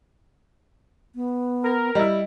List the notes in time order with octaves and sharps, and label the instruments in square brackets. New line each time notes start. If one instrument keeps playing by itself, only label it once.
[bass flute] B3
[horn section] A#4
[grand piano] G3 E4 [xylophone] D#5